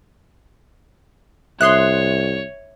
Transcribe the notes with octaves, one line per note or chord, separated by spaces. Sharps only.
C2 C#5 E5 C6 D#6 F#6